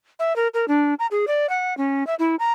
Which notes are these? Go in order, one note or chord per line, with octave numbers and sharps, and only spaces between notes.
E5
A#4
A#4
D4
A#5
G#4
D5
F#5
C#4
E5
E4
A#5